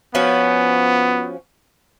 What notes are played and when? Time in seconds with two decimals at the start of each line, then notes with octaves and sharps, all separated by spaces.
0.15 F3 B3 C#4 F#4